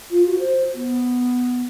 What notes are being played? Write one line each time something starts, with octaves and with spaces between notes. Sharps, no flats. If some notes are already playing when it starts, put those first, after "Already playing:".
F4
F#4
C5
B3